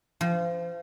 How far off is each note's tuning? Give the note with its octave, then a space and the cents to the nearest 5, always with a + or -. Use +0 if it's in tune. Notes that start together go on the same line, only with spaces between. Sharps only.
F3 -30